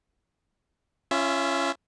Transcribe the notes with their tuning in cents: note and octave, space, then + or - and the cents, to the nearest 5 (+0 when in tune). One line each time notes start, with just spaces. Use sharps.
C#4 +0 F4 -30 E5 +0